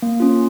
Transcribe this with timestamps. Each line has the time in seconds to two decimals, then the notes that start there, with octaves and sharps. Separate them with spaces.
0.02 A#3
0.20 C#4 F4